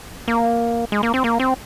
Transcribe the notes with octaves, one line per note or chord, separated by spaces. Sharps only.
A#3
G#3
A#3
C4
A#3
C4